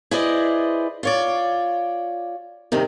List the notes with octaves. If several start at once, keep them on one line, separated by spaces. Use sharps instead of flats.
E4 G#4 B4 C5 D5 D#5
F4 C#5 D5
G2 C3 D#3